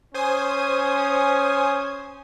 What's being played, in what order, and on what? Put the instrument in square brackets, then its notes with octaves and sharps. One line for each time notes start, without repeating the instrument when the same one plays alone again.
[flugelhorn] C#4 [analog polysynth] C5 G#5 D#6